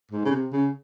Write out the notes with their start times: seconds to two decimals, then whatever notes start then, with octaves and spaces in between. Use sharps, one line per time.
0.11 G#2
0.25 C#3
0.31 C3
0.53 C#3